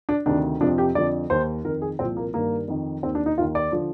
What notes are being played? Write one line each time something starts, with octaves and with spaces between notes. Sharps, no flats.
D4
D2 C3 D#3 D4
F2 C3 F3 D4
G4
F2 D3 F3 D5
D#2 D#3 C5
F2 D#3 A#4
G#4
C2 A#2 F3 C4
A#3
G2 D#3 A#3
F2 D#3
D#2 D#3 C4
D4
D#4
D#2 D#3 F4
D5
D3 F3